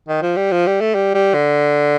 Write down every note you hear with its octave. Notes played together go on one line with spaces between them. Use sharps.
D#3
F3
G3
F3
G3
A3
G3
G3
D3